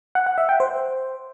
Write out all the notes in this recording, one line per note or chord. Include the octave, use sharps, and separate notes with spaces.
F#5
F#5
E5
G5
C5